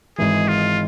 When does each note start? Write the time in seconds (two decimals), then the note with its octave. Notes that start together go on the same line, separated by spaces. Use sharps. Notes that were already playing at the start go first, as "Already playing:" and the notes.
0.18 G#1 G#2 E3 G#4
0.48 F4